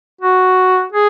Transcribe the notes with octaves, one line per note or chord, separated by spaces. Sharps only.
F#4
G#4